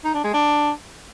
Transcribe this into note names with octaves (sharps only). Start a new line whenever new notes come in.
D#4
D4
G#3
D4